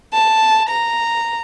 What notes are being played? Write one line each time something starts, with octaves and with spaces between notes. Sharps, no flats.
A5
A#5